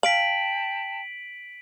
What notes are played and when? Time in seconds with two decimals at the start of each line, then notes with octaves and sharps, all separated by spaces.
0.03 F5 G5 A5 B6 D7 F#7